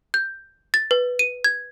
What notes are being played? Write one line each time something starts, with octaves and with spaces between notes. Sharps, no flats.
G6
A6
B4
D#7
G#6